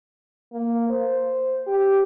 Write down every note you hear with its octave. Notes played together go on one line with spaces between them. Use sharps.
A#3
C5
G4